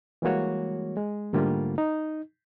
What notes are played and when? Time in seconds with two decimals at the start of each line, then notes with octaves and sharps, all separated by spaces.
0.22 E3 G3 G#3 A#3 F#4 C#5
0.96 G#3
1.33 G#2 D3 G3 A3 A#3 F4
1.78 D#4